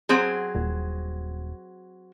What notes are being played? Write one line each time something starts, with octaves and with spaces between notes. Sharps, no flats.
F#3 C4 G#4
D#1